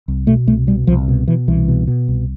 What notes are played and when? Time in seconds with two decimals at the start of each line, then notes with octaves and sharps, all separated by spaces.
0.08 C2
0.27 B2 A3
0.47 C2 A3
0.67 B2 G3
0.87 C2 F3
1.08 B2
1.28 B2 E3
1.48 C2 E3
1.68 B2
1.87 B2
2.08 C2